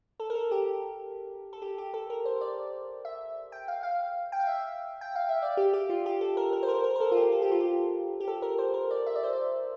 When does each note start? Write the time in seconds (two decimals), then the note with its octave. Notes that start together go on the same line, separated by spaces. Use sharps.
0.20 A4
0.30 A#4
0.35 A4
0.51 G4
1.53 A4
1.62 G4
1.78 G4
1.94 A4
2.10 A#4
2.25 C5
2.41 D5
3.05 E5
3.52 G5
3.68 F5
3.83 F5
4.32 G5
4.39 F5
4.47 E5
5.01 G5
5.15 F5
5.29 E5
5.42 D5
5.57 G4
5.74 G4
5.90 F4
6.06 G4
6.21 A4
6.37 A#4
6.53 A#4
6.63 C5
6.68 A#4
6.84 A#4
6.96 A#4
7.00 A4
7.11 F4
7.17 G4
7.32 A4
7.42 G4
7.51 F4
7.60 G4
8.20 G4
8.28 A4
8.42 A#4
8.58 C5
8.74 A#4
8.91 D5
9.06 E5
9.16 D5
9.23 C5
9.33 D5